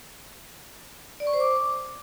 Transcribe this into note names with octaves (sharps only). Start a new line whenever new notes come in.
D5
C#6
C5
D6